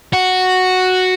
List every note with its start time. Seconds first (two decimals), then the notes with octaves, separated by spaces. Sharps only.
0.13 F#4